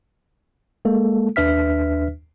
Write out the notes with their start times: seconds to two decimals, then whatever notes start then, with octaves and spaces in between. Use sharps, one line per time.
0.85 G#3 A#3 A4
1.36 D#2 D4 B4 E5 F6 B6